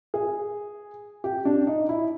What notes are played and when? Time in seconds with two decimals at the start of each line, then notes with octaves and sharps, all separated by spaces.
0.14 G#4
1.24 G4
1.45 D4
1.67 D#4
1.89 E4